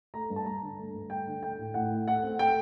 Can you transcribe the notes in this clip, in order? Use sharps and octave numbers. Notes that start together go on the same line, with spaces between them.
A3 A#5
G2
A5
G2 A#5
D3
A3
G2
A3 G5
D3
A3 G5
A2
A2 F#5
A3
A3 F#5
C4
A3 G5